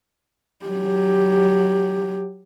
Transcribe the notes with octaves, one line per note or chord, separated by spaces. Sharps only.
F#3 G4